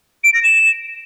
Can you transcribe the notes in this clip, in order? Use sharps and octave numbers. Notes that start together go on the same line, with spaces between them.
D7
A#6
E7